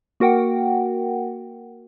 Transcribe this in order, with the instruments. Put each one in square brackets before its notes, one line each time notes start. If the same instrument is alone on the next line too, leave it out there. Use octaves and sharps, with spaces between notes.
[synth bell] A#3 F#4 A#4 F#5 G5